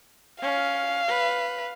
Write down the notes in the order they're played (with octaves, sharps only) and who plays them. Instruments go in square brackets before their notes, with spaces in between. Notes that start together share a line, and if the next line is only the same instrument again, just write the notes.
[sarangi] C#4 [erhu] F5
[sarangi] B4